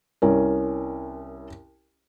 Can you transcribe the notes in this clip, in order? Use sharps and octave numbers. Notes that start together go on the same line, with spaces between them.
C2 C#4 A#4